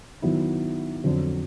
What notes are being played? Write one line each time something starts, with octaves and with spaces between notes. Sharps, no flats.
D#3 F#3 B3 E4
F2 D3 F#3